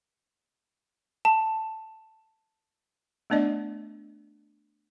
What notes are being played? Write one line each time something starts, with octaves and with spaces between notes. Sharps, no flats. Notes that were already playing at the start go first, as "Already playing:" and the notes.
A5
A3 B3 D4 D5 D#5